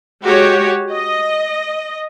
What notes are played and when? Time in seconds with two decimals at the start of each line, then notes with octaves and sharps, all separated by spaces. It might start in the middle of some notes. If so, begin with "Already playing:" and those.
0.23 G#3 F#4 G4 C#5
0.92 D#5